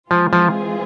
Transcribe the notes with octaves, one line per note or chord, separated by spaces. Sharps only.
E3 F3 G#3 C4 F4 G#4
F3